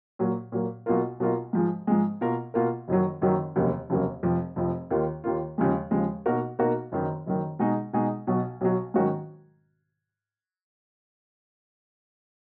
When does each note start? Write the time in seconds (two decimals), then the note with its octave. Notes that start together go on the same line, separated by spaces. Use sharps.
0.19 A#2 F#3 A#3
0.52 A#2 F#3 A#3
0.86 B1 B2 A#3 F4 A#4
1.20 B1 B2 A#3 F4 A#4
1.53 G#2 F3 G#3
1.87 G#2 F3 G#3
2.21 B2 A#3 F4 A#4
2.54 B2 A#3 F4 A#4
2.88 F#1 F#2 D#3 F#3
3.21 F#1 F#2 D#3 F#3
3.56 F1 D#2 C#3 F#3 A#3
3.90 F1 D#2 C#3 F#3 A#3
4.23 F1 F2 F3
4.56 F1 F2 F3
4.91 D#2 D#3 A#3 F4
5.24 D#2 D#3 A#3 F4
5.58 D#2 C#3 F3 G#3
5.91 D#2 C#3 F3 G#3
6.26 B2 A#3 D#4 F#4 A#4
6.59 B2 A#3 D#4 F#4 A#4
6.92 F#1 F#2 D#3
7.26 F#1 F#2 D#3
7.59 B2 G#3 D#4 G#4
7.93 B2 G#3 D#4 G#4
8.27 B1 B2 F#3
8.61 B1 B2 F#3
8.94 G#2 D#3 F#3 C#4 F#4